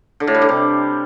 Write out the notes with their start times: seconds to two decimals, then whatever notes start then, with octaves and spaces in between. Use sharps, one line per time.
0.20 D3
0.27 A2
0.35 G3
0.42 D3
0.49 C3